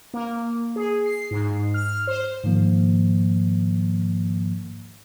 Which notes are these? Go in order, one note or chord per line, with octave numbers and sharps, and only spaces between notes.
A#3
G#4
C7
G#2
F6
C5
G#2 D#3 F3 A#3